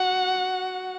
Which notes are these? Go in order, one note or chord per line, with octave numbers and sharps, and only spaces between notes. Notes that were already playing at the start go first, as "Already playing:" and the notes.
Already playing: F#4 F#5